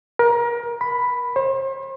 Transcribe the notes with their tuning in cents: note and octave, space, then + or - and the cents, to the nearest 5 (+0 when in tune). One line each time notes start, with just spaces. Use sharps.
A#4 +30
B5 +5
C5 +40